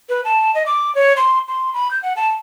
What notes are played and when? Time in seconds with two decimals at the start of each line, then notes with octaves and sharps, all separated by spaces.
0.09 B4
0.25 A5
0.55 D#5
0.66 D6
0.95 C#5
1.17 C6
1.48 C6
1.74 B5
1.91 G6
2.03 F#5
2.16 A5